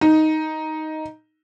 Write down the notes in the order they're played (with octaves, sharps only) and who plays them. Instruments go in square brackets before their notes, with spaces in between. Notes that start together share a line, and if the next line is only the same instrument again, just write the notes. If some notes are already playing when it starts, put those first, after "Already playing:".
[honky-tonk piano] D#4